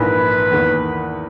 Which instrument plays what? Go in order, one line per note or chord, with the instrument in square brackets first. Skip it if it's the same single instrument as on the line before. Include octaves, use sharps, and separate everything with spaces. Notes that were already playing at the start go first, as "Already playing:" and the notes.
Already playing: [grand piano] A#1 G#2 E3 A#3 [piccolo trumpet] B4
[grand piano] E2 D#3 A#3